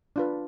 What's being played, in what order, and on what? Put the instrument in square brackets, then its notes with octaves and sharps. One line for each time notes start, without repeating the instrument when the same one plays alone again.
[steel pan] D4 F4 B4